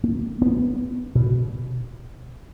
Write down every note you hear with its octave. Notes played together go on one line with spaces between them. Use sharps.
A#3
B3
B2